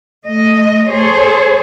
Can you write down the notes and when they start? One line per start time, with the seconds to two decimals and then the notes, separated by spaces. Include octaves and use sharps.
0.24 A3 D#5
0.89 G#4 A4 C5 C#5